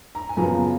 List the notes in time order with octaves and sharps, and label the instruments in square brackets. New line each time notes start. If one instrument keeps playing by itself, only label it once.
[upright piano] A#5
G#5
F#2 C#3 F3 B3 A#5